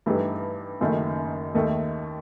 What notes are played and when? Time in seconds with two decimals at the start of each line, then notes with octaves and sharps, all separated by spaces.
0.06 G2 E3 A3 D#4 G4
0.81 F#1 F#2 D#3 A3
1.54 D#2 D#3 A3